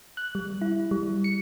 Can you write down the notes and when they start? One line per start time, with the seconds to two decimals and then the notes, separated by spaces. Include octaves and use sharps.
0.17 F#6
0.35 G3
0.62 E4
0.91 G3
1.24 C#7